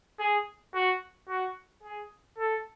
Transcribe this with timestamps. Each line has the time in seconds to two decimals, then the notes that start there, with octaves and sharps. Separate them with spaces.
0.19 G#4
0.75 F#4
1.29 F#4
1.83 G#4
2.39 A4